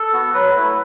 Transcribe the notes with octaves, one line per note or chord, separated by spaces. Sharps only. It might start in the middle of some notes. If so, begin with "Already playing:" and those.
Already playing: A4
B3 F#4
F#3 B4
A3 E4